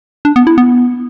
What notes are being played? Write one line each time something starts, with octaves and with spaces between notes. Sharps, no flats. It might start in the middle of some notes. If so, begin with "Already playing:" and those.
D4
B3
E4
B3